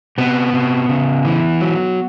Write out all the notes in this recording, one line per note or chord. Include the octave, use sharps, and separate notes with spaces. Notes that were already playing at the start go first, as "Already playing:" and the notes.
C3 B3
C3
C#3
E3
F#3